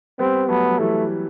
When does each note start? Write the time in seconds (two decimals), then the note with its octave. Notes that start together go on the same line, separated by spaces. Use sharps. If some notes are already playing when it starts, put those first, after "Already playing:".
0.19 G3 B3 C4
0.49 F#3 A3 B3
0.69 F#3
0.78 E3 G3 A3